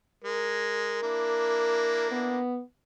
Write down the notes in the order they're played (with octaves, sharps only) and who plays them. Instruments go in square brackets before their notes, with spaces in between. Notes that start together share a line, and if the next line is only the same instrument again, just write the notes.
[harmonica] G#3 [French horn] A#4
[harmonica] A#3 D4 E4
[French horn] B3